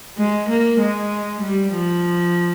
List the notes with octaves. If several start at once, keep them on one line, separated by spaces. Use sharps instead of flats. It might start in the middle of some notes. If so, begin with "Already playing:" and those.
G#3
A#3
G#3
G3
F3